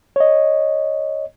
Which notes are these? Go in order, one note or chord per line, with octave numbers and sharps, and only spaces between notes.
C#5 D#5